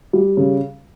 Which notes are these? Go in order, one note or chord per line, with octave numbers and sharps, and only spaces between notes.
G3
C#3